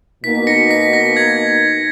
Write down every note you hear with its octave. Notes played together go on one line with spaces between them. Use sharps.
B2 A#3 D#4 B6
A#6 C#7
B6
A#6
G#6